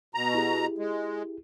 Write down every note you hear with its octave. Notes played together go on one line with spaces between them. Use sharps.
B2 A#5
E4 G4 G#4
G#3